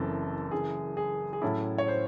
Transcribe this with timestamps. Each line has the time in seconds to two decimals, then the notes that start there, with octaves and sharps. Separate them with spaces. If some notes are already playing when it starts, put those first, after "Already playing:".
Already playing: F#1 F#2 E3 C4 A4
0.51 F#1 F#2 E3 G#4
0.97 G#4
1.33 G#4
1.42 A2 F#3 C#4 E4 A4
1.78 C#5
1.88 C5